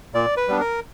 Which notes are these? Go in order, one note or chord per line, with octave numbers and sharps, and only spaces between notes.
A#2 D5
B4
G3 B3 D4
A#4